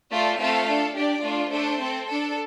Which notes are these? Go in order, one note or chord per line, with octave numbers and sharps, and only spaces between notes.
A3 F4 A4 D5
A3 C4 F4 A4 F5
D4 A4
D4 G4 D5
A3 D4 F4
A3 D4 A4 C5
C4 A4
D4 A4